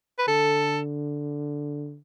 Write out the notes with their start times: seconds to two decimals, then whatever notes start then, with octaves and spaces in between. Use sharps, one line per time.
0.19 B4
0.28 D3 A4